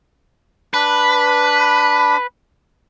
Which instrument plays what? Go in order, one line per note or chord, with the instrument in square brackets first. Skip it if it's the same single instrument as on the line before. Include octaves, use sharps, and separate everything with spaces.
[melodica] D4 B5 [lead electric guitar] B4